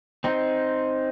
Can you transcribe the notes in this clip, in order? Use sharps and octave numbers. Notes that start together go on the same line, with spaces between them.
C4 D#4